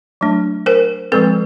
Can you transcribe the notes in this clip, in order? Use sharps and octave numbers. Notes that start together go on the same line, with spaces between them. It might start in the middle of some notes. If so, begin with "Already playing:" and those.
F#3 A3 D4
A#4 C5
F3 G#3 C4 A4 B4